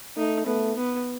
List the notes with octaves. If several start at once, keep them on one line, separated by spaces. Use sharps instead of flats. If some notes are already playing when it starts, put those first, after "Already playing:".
A3 D#4
A3 B3
B3